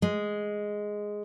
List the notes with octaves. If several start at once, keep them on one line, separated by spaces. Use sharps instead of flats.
G#3